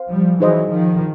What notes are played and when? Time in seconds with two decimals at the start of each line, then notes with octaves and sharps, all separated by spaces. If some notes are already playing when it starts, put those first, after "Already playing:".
Already playing: C5 F5
0.09 F3 G3
0.40 E3 F#3 D#4 G#4 C5 D#5
0.72 D#3 F3